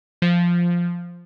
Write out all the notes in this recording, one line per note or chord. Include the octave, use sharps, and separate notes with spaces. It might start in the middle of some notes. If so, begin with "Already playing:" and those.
F3